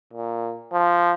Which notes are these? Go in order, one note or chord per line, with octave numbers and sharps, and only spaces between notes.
A#2
F3